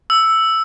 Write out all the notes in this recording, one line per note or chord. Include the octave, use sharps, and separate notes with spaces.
E6